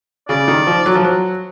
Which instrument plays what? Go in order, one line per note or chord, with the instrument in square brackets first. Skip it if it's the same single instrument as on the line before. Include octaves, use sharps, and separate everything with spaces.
[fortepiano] C#3 [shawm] D5
[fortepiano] D#3
F3
F#3
F3
F#3